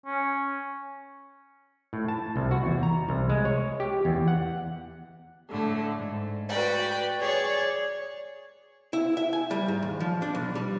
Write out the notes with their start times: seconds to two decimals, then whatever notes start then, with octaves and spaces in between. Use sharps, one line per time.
0.06 C#4
1.93 A2
2.08 A5
2.36 C2
2.51 F#4
2.66 E2
2.83 A#5
3.09 C2
3.29 G#3
3.45 C#5
3.80 G4
4.05 E2
4.28 F#5
5.50 A2 D3 A3
5.97 G#2
6.48 F#4 B4 D5 G5
7.19 G#4 C#5 D5 C#6
8.93 E4
9.17 E5
9.33 G#5
9.51 G3
9.68 G#2
9.82 D#2
10.00 F3
10.22 D4
10.35 B1
10.55 G3